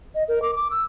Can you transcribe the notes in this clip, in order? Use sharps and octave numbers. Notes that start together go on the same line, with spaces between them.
D#5
A#4
D6
D6
E6